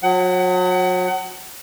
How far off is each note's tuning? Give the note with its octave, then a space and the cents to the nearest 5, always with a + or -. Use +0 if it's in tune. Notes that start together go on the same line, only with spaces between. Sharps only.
F#3 -35 F#5 +30